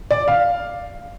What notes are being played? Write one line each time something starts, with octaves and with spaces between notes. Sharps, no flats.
D5
F5